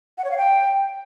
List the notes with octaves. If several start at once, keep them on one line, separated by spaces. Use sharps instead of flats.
F#5
C#5
F5
G5